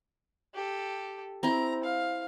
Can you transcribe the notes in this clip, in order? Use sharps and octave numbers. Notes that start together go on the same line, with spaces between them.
G4 A4
C4 E4 A#5
F5